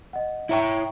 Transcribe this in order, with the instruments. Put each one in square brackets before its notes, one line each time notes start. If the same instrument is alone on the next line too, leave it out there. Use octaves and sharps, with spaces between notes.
[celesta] D#5 F#5
[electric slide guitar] E4 C#5 G5 [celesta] E5 A#5 C#6